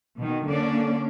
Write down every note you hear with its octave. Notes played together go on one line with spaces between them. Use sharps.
B2 D#3
D3 A#3 C#4 D4 D5